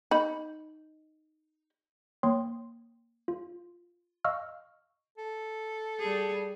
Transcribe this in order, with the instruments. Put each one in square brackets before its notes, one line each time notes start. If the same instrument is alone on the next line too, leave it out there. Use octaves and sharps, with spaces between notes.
[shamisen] D#4 B5
[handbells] A#3 C#5 G5 C6 D#6
F4
D#5 F5 C#6 E6 F6
[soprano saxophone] A4
[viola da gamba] G3 G#4